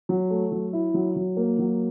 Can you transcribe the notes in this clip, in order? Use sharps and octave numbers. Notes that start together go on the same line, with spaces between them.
F#3
A3
F#3
E4
F#3
F#3
A#3
F#3